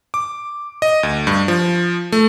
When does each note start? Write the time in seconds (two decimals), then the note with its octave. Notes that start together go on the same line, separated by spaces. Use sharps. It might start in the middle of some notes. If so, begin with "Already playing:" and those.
0.14 D6
0.82 D#5
1.03 D2
1.27 G2
1.48 F3
2.12 A3